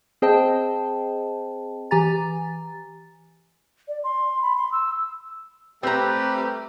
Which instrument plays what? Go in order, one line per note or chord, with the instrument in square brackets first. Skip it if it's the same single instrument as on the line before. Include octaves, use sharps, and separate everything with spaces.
[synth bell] C4 G#4 C5 D#5 G5 A5
E3 G4 G#5 A#5 A6
[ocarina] D5
C6
B5
C6
E6
[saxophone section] G3 A3 G4 [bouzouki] C4 A#5 [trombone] B4